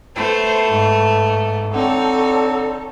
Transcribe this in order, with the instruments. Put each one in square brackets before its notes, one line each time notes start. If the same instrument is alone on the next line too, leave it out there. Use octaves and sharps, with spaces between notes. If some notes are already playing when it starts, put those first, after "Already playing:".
[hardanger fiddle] A3 B3 [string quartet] C5
[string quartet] G#2
[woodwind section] D3 C4 [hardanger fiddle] D#4 [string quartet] A4 C#5